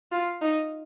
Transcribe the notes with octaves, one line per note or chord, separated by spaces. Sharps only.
F4
D#4